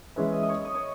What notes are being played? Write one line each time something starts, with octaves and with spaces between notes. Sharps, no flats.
E3 G#3 C#4 G#4 B4 E5
D#5
D#5
C#5
D#5
C#5